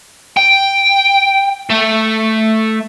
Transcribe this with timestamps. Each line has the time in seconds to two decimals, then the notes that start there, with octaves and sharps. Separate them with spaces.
0.37 G5
1.70 A3